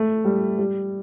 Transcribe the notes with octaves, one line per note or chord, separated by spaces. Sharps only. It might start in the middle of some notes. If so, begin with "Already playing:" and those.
Already playing: A3
G3
G3